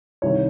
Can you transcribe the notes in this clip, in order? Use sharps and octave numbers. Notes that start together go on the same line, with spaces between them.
C2 C3 D#3 C#5